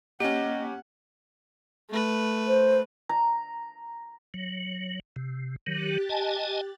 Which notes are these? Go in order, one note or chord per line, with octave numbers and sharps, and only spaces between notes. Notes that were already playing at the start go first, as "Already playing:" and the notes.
A#3 C#4 G4 D#5 F#5
A3 B4
C5
A#5
F#3
C3
D#3 F#3 G4 F#6 A6
D#5 G#5 A5